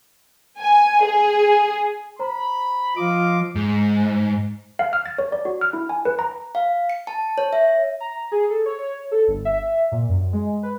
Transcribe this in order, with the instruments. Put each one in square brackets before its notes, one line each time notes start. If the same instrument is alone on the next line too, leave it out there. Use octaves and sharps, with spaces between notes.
[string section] G#5
G#4
[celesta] C5 A#5 [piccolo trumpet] B5
[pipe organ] F3 D6 [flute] F4 [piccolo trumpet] D#5
[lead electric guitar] G#2
[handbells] F5
F6
A6
C#5
D5
F#4
F6
E4
G#5
B4
A#5
[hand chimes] F5
C#7
A5
C#5
E5
[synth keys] A#5
G#4
A4
C#5
C#5
A4
G1
E5
A#2
F#2
G#3
B4